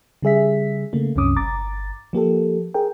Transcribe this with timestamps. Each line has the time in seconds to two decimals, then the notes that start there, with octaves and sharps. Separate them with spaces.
0.22 C#3 G3 G#4 E5 B6
0.93 C#3 A3 A#3
1.16 C2 F#2 C3 C#4 D6 D#6
1.36 G1 A#5 D6 A6
2.13 F3 A#3 G4 A4
2.74 G#4 A#4 G5